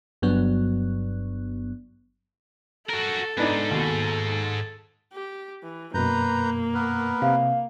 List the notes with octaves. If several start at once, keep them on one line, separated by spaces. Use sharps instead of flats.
G1 G2 F#3 B3
F#4 A4 A#4
G#2 B3 D4 D#4
D#2 B2
G4
E3
F#2 B2 A#3 B4 A#5 G6
B3 A#4 B4
C3 F5